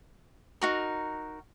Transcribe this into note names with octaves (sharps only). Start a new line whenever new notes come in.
D#4 F#4 A#4